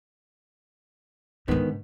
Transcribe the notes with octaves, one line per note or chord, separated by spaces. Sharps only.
G#2 D3 D#3 B3